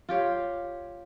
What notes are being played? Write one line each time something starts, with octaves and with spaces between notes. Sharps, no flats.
F4 G4 C#5